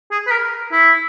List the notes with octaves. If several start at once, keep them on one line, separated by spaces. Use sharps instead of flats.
G#4
B4
A#4
E4